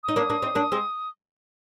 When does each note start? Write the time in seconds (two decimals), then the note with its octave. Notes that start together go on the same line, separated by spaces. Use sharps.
0.04 D#4 D#6
0.16 A#3 D4
0.30 A#3 D4
0.42 C4 D#4
0.55 A#3 D4
0.72 G#3 C4